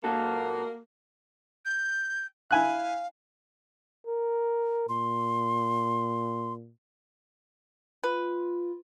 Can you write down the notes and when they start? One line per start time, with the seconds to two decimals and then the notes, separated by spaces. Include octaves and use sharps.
0.04 A#2 A#3 F#4 A4
1.65 G6
2.51 E4 F5 G#5 F#6
4.07 A#4
4.89 A#2 C6
8.04 F4 B4